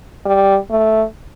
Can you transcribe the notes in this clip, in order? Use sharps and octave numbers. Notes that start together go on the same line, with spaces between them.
G3
A3